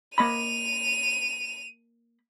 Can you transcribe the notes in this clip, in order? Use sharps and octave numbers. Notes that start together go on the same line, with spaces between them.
A#3 D#5 B5 D#7 F7